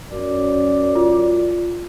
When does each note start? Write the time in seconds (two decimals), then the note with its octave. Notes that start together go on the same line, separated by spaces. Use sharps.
0.12 F#2 D5
0.95 F4